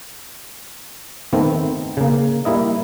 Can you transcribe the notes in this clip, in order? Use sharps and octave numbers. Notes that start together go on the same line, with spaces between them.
D#3 A3 B3 C4
C#3 A#3
G3 A#3 E4 D#5